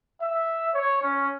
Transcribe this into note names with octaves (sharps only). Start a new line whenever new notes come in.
E5
C#5
C#4